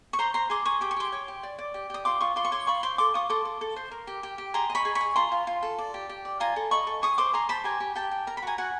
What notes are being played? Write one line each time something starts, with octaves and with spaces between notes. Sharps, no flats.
C#6
C5 A#5 C6
C5 A#5 C6
G#4 C6 D6
G#4 C#6 D#6
G4 D6
C#6
G4 C6 D6
C#5
G4
D5
D5
G4
G4 D#6
F4 C6 D6
F4 C#6 D#6
F4 C6 D6
C#6
C#5 C6 D6
F4 B5 C#6
C5 C6 D6
A4 C6 D6
F4 C#6 D#6
A4 C6 D6
A4
A4
C5
A#4
G4
G4
G4
G#4 A#5 C6
D#5
B5 C#6
G#4
B5 C#6
G#4
F4 A#5 C6
F4
F4
A4
D5
G4
G4
D5
F4 G#5 A#5
A4
D#5 B5 C#6
A4
G#4 C#6 D#6
C5 C6 D6
G#4 A#5 C6
C5 A5 B5
G4 G#5 A#5
G4
G4 G5 A5
G4
A#4 A#5
B5
F#4 G#5 A#5
F#4 F#5 G#5